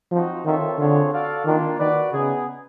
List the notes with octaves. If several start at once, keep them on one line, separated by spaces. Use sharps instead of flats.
F3 C4 D#4 F#4
D#3 C4 F4 A4 C#5 E5
D3 C4 F4 G#4 C#5 F#5
F#4 A4 D5 F5
D#3 A#3 D4 F4
D#3 F#4 B4 D5
C#3 B3 D#4 G#4